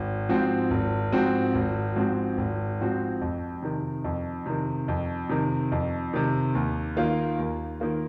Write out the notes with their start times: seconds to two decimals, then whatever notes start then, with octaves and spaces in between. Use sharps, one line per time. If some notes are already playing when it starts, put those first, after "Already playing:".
Already playing: G#1
0.29 G#2 F3 C4 F#4
0.70 G#1
1.12 G#2 F3 C4 F#4
1.54 G#1
1.96 G#2 F3 C4 F#4
2.38 G#1
2.80 G#2 F3 C4 F#4
3.21 F2
3.62 C3 D#3
4.04 F2
4.46 C3 D#3
4.88 F2
5.29 C3 D#3
5.72 F2
6.13 C3 D#3
6.55 D#2
6.97 D#3 A#3 F4
7.39 D#2
7.80 D#3 A#3 F4